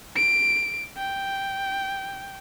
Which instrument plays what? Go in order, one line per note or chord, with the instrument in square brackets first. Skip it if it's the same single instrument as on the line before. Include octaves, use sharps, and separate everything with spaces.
[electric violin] D7
G5